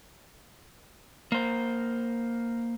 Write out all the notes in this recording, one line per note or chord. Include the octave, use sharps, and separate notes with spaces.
A#3 C5